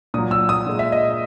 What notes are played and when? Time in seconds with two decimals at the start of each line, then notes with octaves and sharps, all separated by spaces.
0.14 A#2 D#6
0.18 F#3
0.31 E6
0.49 D#6
0.67 A#2 G#3
0.79 E5
0.92 D#5